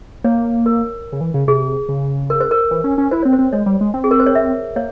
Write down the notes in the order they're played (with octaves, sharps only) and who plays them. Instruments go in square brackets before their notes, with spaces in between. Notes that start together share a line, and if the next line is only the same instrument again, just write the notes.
[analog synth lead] A#3 [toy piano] C#5
[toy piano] A#4
[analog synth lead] C#3
E3
C#3
[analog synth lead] C3 [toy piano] G#4
[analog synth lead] C#3
[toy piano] A#4
C5
A#4
[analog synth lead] E3
C#4
C#4
[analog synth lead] E4 [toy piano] C5
[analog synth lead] C4 [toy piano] C#5
[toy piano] C5
[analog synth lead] C4
[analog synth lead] G#3 [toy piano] C#5
[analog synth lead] G3
G#3
C4
[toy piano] G#4
A#4
C5
C#5
E5
[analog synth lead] A#3 [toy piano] C#5